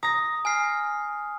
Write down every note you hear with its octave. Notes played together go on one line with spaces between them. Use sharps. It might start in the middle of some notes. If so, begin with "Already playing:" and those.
A#5 D#6 A#6
G#5 F6 C7